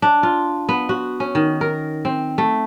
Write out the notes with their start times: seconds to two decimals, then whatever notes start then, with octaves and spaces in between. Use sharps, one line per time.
0.02 D4
0.23 F4
0.69 B3
0.89 F#4
1.20 C#4
1.35 D#3
1.61 A#4
2.05 C4
2.38 A3